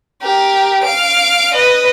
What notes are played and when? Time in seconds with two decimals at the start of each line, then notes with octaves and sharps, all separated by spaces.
0.22 G4 A#4
0.83 F5 D7
1.54 B4 D#5